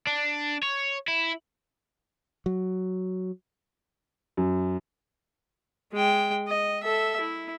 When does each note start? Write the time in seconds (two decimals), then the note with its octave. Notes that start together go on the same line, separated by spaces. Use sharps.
0.07 D4
0.63 C#5
1.08 E4
2.46 F#3
4.37 F#2
5.92 G#3 G5
6.47 D#5
6.83 A4 E5
7.20 E4